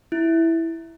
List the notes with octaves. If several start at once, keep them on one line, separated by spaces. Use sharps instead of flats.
E4